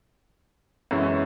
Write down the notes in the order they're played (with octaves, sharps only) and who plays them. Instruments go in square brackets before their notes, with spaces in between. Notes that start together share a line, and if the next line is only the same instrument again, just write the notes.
[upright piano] F#2 E3 G#3 C#4 E4